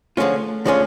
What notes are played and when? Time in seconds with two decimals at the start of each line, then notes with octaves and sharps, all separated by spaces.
0.17 D3 F3 G#3 A3 C#4 F4
0.66 D3 F3 G#3 C#4 F4